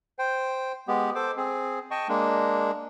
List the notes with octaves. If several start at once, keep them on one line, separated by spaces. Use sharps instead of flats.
C5 G5
G#3 B3 G4
A4 C5 D6
C4 G#4
D#5 G5 A5 C#6
G#3 A#3 D4